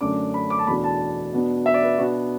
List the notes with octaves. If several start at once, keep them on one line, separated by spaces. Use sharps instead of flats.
F#2 D3 A3 D4 D6
B5
D6
A5
E2 B2 A3 D4 B5
A5
B2 B3 D4
E5
D5
B4
B2 B3 D4 F#4